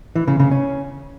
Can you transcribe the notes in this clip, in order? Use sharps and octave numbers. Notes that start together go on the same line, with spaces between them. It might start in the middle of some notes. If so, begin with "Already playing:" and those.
E3
C#3
C#3
C#4